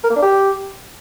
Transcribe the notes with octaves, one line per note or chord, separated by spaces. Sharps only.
A#4
A#3
D4
G4